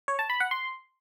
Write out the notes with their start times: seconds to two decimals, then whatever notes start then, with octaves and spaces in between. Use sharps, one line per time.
0.08 C#5
0.19 A5
0.30 B5
0.40 F#5
0.51 C6